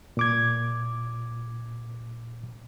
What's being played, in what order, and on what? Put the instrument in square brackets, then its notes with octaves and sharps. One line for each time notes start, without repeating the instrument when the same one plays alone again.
[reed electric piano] A#2 D6 G#6